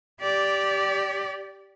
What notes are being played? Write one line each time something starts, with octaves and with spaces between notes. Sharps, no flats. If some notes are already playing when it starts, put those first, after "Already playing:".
G4 D5